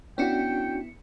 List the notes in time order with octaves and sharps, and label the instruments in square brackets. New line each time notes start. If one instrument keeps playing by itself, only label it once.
[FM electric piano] B3 E4 C#7 [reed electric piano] C#4 D4 F#4 [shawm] G5